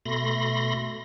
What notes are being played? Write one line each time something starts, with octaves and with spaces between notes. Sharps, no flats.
B2 A3 B5 C6 A#6